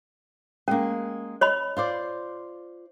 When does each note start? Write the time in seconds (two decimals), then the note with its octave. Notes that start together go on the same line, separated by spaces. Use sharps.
0.68 G#3 A#3 C#4
1.41 C#5 D#5 B5
1.77 F4 C5 D5